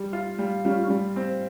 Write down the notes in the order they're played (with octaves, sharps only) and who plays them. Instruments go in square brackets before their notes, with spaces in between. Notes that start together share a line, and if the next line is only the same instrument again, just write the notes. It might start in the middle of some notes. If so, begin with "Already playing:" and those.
Already playing: [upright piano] G3
F4
G3
[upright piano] G3 [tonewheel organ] C#4 F4
[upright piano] G3
C4